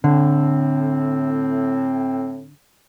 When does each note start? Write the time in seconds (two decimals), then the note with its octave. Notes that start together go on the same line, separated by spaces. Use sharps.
0.04 A2 D3 C4